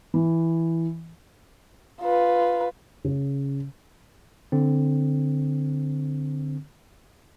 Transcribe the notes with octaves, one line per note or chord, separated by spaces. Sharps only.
E3
F4 B4
C#3
D3 C4